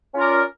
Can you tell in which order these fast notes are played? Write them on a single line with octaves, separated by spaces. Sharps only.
C#4 F4 A#4 D5